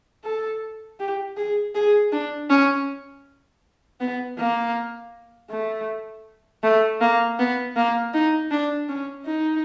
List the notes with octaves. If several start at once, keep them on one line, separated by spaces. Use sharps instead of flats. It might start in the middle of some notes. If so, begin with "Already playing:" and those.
A4
G4
G#4
G#4
D4
C#4
B3
A#3
A3
A3
A#3
B3
A#3
D#4
D4
C#4
D#4